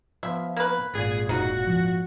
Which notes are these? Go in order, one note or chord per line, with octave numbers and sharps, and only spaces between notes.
F3 B3 F4 E5
A#3 B4
G#1 A#2 G#4
E1 D#4 F#4
F3